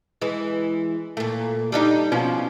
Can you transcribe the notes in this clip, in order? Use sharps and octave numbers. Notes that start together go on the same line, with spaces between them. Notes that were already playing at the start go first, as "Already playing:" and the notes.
E3 G#3
A#2 A3
G3 D4 D#4
B2 F3 C#4